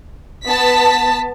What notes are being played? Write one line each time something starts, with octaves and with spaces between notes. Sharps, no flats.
B3 A5 B6